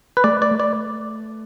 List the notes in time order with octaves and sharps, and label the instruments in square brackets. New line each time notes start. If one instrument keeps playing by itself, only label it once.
[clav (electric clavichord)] B4
[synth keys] A3 [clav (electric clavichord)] D5
[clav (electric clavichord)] D5
[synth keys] A3
[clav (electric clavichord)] D5